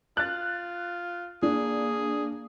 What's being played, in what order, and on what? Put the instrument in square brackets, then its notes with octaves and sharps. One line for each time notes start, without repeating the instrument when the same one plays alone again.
[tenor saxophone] F4 [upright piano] F#6 A6
[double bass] A#3 [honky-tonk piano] D4 [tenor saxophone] G#4